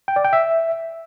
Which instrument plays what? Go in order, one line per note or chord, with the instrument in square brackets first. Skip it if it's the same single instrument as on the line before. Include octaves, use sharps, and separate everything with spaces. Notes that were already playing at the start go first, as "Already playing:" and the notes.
[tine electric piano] G5
D5
G5
E5